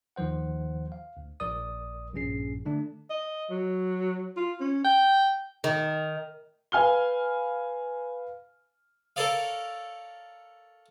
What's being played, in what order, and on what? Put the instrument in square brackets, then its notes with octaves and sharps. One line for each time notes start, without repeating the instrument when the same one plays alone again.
[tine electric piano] D#2 D#3 F3 C5 F#5
F5
D2
A#1 A#4 D5 D#6
A#1 G2 A#2 C#4 G#4 C7
D3 A3 D4
[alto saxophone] D#5
F#3
F4
C#4
G5
[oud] D#3
[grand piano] B4 F5 G#5 F6 G7
[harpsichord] A4 A#4 C#5 D5 F5